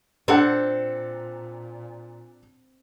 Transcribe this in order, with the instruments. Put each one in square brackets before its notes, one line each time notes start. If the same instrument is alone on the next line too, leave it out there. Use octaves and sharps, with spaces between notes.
[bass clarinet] A#2 [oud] C4 [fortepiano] D4 A4 F#5